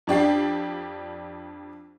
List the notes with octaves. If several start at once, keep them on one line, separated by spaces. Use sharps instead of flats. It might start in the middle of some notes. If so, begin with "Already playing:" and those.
F2 D4 G4 C7